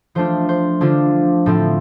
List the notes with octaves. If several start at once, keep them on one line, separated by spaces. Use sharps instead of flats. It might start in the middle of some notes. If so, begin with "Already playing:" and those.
F3 A3 D4 F4 C5
C5
D3 F3 D4 F4
A2 F3 C4 A4